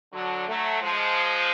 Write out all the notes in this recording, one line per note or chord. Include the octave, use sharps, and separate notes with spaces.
D3 F#3
F#3 A3
F3 G#3